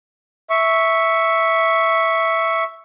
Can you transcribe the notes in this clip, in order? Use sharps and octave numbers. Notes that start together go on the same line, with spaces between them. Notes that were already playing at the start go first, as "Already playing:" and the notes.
E5 C#6